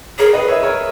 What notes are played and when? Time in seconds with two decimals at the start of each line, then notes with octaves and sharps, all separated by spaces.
0.19 G#4 A#4 C#5
0.33 B4 D#5
0.48 C#5 E5
0.63 A#4 C#5